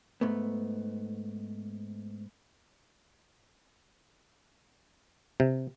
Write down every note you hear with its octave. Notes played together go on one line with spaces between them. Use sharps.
G#2 A3 B3
C3